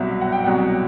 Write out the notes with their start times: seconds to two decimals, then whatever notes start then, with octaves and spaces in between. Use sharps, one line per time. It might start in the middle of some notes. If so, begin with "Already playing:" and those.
Already playing: C2 B2 F#3 E5
0.21 F#5
0.32 G5
0.44 C2 B2 F#3 F#5